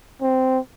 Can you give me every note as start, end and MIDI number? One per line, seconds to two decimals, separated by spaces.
0.21 0.59 60